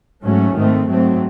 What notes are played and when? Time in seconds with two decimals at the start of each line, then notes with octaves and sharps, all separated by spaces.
0.24 G#2 F#3 A3 C#4
0.56 G#2 D#3 A3 C4
0.87 G#2 F#3 A3 C4